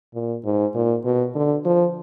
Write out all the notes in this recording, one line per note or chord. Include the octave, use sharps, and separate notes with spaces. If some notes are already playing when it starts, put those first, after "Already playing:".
A#2
G#2
A#2
B2
D3
F3